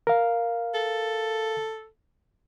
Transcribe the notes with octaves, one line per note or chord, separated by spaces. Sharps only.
A#4 F5
A4